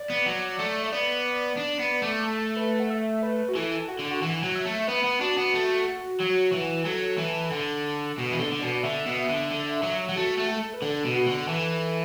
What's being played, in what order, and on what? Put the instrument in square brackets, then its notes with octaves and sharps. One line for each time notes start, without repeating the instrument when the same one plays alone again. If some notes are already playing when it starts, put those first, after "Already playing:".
Already playing: [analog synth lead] D5
[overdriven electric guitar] B3
F#3
A3
[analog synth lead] E5
[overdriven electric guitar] B3 [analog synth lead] D5
[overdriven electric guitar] D4
B3
A3
[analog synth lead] A4
B4
F#5
E5
B4
F#4
[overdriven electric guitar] E3 [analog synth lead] A4
[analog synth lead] F#4
[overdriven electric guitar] D3
[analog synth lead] F#4
[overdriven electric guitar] E3 [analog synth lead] F#5
[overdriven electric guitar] F#3
[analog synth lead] E5
[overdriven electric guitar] A3
[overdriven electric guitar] B3 [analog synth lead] B4
[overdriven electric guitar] B3
[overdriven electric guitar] D4 [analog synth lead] F#4
[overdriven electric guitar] B3
A3
F#3
E3
[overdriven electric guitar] F#3 [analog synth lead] A4
[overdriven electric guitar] E3
D3
[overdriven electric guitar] B2 [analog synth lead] F#4
[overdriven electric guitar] E3
[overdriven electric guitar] D3 [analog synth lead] A4
[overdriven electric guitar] D3
[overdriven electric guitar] B2 [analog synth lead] D5
[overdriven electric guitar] D3 [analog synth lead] E5
[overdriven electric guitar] B2
D3
D3
F#3
F#3
[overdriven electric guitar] A3 [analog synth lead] F#4
[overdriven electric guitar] A3
[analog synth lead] A4
B4
[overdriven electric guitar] D3 [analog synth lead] A4
[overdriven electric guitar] B2
[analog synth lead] F#4
[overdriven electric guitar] D3
[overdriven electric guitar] E3 [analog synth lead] A4